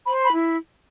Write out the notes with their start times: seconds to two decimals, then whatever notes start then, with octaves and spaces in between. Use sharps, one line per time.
0.07 C5 B5
0.26 B5
0.31 E4